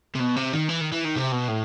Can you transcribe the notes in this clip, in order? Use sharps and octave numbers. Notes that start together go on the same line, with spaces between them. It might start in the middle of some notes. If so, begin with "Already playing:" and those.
C3
B2
C3
D#3
E3
D#3
E3
D#3
C3
B2
A2